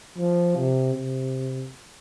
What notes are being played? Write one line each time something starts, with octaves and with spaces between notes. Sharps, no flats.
F3
C3
C3